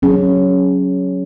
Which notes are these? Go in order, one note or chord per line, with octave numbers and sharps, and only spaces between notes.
F#3 C#4 G#4